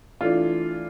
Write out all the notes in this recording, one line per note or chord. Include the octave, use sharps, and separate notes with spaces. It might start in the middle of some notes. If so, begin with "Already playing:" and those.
E3 A3 D4 F4